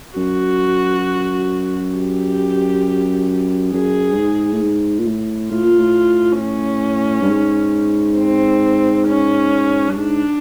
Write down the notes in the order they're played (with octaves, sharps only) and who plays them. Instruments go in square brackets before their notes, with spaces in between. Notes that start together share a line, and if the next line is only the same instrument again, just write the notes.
[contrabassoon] F#2 [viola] F#4
[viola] G4
[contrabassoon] F#2 [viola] G#4
[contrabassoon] G2
G#2
A2
G#2
A#2
A2
[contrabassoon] A2 [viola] F4
[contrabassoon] A#2
A2
[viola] C#4
[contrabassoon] G2
G#2
[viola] C4
C#4
[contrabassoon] G2
[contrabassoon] G#2 [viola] D4